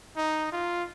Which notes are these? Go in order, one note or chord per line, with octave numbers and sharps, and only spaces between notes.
D#4
F4